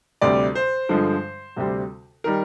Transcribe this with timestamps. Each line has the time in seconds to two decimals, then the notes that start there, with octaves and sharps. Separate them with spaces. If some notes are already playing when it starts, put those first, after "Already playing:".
0.21 D2 C3 G3 D5
0.55 C5
0.89 G2 D3 F3 G#3
1.56 D2 C3 G3 C4
2.24 D#3 G3 A#4